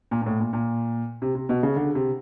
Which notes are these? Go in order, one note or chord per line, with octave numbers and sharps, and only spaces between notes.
A#2
A#2
A2
A#2
A#2
C3
C3
B2
C#3
D3
C3